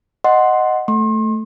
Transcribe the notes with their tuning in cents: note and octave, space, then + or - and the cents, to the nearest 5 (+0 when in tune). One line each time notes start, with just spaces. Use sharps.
D#5 +0 F#5 +0 C6 +0
A3 +0 C6 +40